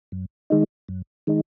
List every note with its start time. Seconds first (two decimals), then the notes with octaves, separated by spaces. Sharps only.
0.12 F#2
0.50 D#3 G#3 D#4
0.89 F#2
1.27 D#3 G#3 D#4